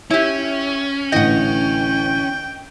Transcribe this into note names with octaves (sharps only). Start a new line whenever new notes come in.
C#4 E4 G4
A1 D3 E3 D#5 F#5 G5